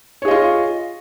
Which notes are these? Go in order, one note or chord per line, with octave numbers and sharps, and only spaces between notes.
F4 G#4 C#5 D#5